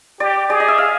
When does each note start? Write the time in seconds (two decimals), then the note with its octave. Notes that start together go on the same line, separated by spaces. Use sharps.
0.20 G4 D5
0.50 G#4 D5
0.60 D#5
0.68 E5
0.78 F5